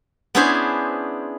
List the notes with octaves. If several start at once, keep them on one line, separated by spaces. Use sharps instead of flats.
B3 C#4 D4 E4 G#4 C5